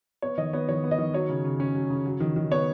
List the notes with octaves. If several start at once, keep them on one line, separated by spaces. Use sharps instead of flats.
B3 C#5
D#3 D#5
B3 C#5
D#3 C#5
B3
D#5
D#3
F#3 C#5
C#3
C#3
C#4
F#3
C#3
F#3
D#3
D#3
B3 C#5